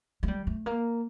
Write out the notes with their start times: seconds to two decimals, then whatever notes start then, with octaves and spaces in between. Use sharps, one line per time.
0.23 A3
0.28 G3
0.47 A3
0.66 A#3